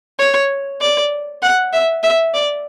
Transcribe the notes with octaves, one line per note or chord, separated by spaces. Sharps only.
C#5
D5
F#5
E5
E5
D5